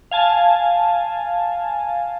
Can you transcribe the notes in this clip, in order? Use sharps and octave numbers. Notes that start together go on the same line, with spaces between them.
F5 G#5 A5